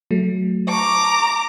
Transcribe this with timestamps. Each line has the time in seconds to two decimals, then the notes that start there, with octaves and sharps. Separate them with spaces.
0.11 F#3 A3
0.69 A5 A#5 C#6 D6